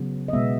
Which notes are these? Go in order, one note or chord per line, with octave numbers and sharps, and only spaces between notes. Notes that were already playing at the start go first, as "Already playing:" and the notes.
Already playing: C#3 F#3 B3
D#5
B2 G#3 B3 E5